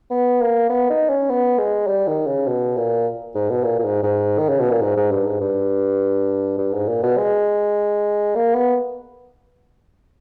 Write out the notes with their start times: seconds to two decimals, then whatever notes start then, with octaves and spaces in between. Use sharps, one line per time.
0.11 B3
0.41 A#3
0.70 B3
0.90 D#4
1.09 C#4
1.30 B3
1.58 G#3
1.87 G3
2.07 D#3
2.27 C#3
2.47 B2
2.77 A#2
3.35 G#2
3.50 B2
3.64 A#2
3.79 A#2
3.84 G#2
4.03 G#2
4.38 D#3
4.49 C#3
4.60 B2
4.70 A#2
4.81 G#2
4.97 G#2
5.11 G2
5.26 G#2
5.41 G2
6.58 G2
6.73 G#2
6.88 A#2
7.03 B2
7.17 G#3
8.35 A#3
8.54 B3